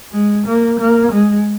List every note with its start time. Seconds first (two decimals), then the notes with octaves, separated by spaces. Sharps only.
0.12 G#3
0.46 A#3
0.79 A#3
1.12 G#3